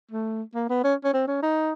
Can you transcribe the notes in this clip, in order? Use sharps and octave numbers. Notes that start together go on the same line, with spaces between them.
A3
A#3
B3
C#4
C#4
C4
C#4
D#4